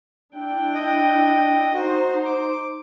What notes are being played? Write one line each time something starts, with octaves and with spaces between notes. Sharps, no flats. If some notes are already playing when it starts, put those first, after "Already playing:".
D4 E4 G5
D#5
D#4 F#4 C5
D6